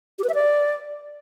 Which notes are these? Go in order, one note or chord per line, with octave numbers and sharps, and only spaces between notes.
G4
B4
E5
D5